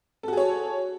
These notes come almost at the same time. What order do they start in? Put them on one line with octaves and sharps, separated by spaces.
A4 F#4 G#4 C#5